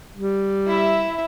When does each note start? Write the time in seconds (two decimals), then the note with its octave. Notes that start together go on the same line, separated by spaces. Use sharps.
0.16 G3
0.67 E4 E5